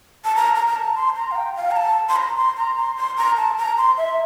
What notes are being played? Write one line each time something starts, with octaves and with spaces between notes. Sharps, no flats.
A5
A#5
A#5
A#5
A5
C6
A#5
F5
G5
F5
A#5
A5
C6
A#5
C6
A#5
C6
C6
A#5
A5
A#5
C6
E5